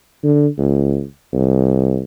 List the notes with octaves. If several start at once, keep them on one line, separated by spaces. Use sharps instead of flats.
D3
C#2
C2